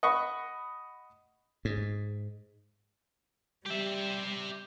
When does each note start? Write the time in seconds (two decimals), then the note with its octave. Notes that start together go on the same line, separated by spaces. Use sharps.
0.03 D#5 F#5 B5 C#6
1.65 G#2
3.66 G3 G4 E5